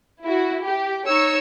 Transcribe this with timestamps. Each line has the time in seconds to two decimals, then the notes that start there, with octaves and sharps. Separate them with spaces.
0.23 E4 F#4
0.66 G4
1.07 D#4 C#5 E6 C#7